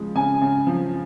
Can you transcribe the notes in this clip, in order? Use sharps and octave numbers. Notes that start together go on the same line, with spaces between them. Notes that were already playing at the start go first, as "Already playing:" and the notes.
Already playing: C#3 F3 G#3
C#3 G#5
C#3
F3